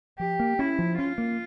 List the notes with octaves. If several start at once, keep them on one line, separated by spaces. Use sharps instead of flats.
F3 G4
A#3
C#4 E4
F3
C#4 F4
A#3